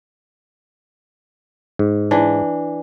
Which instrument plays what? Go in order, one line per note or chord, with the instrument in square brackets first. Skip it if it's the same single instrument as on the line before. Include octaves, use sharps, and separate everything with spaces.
[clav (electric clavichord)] G#2
[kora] E3 D4